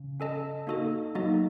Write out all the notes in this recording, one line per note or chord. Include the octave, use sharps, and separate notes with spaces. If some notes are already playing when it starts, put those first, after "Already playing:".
Already playing: C#3
C#4 A4 D#5 A5
A#3 D#4 F#4 A4 D#5
F#3 A#3 D#4 F#4 A4 D#5